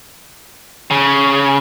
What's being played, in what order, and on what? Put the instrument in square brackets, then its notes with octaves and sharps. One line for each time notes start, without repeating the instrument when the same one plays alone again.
[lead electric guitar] C#3